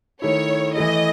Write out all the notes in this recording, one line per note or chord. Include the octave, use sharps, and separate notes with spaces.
D#3 A3 E4 C#5
E3 A3 E4 D#5